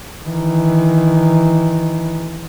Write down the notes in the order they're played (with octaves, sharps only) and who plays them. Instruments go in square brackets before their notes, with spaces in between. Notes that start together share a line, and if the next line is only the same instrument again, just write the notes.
[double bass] D#3 E3